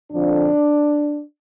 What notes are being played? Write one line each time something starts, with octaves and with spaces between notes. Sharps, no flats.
F2 D3 F3 D4